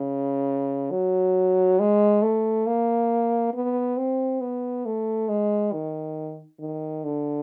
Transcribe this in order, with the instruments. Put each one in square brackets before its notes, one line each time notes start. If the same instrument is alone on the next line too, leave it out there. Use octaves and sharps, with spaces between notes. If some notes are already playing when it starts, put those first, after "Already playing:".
Already playing: [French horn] C#3
F#3
G#3
A3
A#3
B3
C4
B3
A3
G#3
D#3
D#3
D3